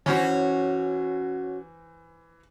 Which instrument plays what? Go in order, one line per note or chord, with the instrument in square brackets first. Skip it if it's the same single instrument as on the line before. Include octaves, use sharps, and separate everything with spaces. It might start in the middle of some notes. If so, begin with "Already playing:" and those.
[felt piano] E3 C5 [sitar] C#4 F#4